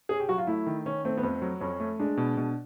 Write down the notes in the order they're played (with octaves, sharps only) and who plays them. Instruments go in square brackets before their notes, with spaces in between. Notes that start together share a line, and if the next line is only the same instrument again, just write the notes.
[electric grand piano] C#4 [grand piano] G#4
[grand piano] G4
[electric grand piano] F#3 [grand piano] F#4
[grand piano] F4
[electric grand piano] A3 [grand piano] E4
[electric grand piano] D#3
[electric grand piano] D#3 [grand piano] C#4
[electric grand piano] A3 [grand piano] C4
[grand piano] B3
[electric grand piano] F2 [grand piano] C4
[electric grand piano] F#3
[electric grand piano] F2 [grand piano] C#4
[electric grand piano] A3
[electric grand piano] G#3 [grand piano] D4
[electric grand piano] B2
B2